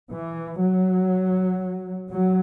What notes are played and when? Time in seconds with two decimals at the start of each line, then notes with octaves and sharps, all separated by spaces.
0.10 E3
0.60 F#3
2.10 F#3